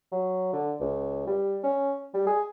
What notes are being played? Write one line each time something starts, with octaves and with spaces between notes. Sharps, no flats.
F#3
D3
C#2
G3
C#4
G3
G#4